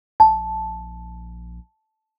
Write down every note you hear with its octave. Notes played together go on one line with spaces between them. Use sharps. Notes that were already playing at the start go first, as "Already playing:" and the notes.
A#1 A5